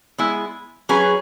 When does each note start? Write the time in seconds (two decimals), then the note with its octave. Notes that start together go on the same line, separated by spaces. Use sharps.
0.18 G#3 B3 E4
0.89 F#3 C#4 G#4 B4